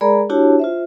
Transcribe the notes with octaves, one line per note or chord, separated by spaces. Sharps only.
G#3 G#4 A#4 D5 A#5 B5
D4 E4 F#4 G4 C#5 A5
F4 C5 E5